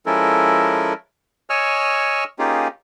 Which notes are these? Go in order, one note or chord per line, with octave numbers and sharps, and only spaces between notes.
F3 G#3 C#4 E4 A4 A#4
C#5 D#5 G#5 C#6 E6 F6
A#3 C#4 D#4 F4 G4 G#4